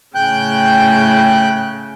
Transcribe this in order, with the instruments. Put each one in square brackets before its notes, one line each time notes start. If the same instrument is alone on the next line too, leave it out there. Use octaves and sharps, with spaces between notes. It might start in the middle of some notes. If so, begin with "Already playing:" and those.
[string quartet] A2 C#3 [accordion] G5 F#6 G6